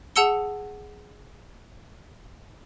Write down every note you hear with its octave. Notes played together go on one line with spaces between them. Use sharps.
G#4 F#5 A5 E6 C#7 G7